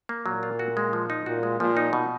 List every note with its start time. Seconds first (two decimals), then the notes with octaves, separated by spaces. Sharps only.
0.09 A#3
0.26 A#2 F#3
0.43 F4
0.59 F#4
0.77 G#3
0.93 F3
1.10 D#4
1.26 A#2 F#4
1.43 G#3
1.60 A#2 F3
1.77 D#4
1.93 B2